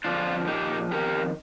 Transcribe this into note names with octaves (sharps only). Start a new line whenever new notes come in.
F2 D3 F3 D4 F4
A#2 F3 D#4 G4
F2 D#3 G4 A#4